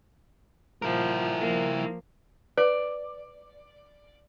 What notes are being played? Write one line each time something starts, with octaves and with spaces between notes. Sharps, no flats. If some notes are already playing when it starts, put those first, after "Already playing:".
A#2 F3 E4 A#4
F3 A#3
B4 D5